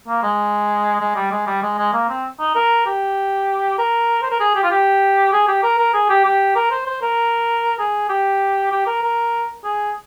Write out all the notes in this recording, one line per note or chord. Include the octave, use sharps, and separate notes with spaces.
A#3
G#3
G#3
G3
G#3
G3
G#3
G#3
A#3
C4
D#4
A#4
G4
A#4
C5
A#4
G#4
G4
F4
G4
G#4
G4
A#4
A#4
G#4
G4
G4
A#4
C5
C5
A#4
G#4
G4
G4
A#4
A#4
G#4